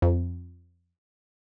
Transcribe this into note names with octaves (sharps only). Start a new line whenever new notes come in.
F2